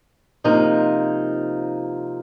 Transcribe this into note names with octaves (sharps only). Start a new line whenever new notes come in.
C3 F3 A#3 D#4